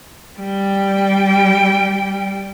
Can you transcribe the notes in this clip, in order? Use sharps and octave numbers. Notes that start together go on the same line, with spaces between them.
G3 G5